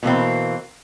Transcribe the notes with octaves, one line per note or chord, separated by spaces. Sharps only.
B2 E3 A#3 C4